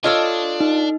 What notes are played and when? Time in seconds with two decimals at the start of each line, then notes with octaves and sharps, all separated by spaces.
0.04 D4 F4 A4 C#5 D#5 E6 F6
0.60 D#4